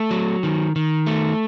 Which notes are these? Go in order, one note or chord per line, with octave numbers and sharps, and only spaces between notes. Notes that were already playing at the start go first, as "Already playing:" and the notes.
Already playing: A3
F#3
D#3
D#3
A3